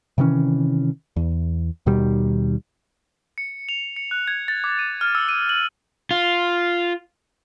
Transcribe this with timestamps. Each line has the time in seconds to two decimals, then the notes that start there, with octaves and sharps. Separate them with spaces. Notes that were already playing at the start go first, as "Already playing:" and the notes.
0.18 C3 D#3 E3 C#4
1.16 E2
1.86 D#2 B2 D#3 G3
3.38 C#7
3.69 F7
3.96 C#7
4.11 F#6
4.28 G#6
4.48 A6
4.64 D6
4.79 D#7
5.01 F6
5.15 E6
5.29 D#7
5.49 F#7
6.11 F4